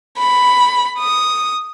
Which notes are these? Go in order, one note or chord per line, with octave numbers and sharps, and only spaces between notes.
B5
D#6